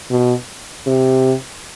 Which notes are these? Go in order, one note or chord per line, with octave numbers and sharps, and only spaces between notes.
B2
C3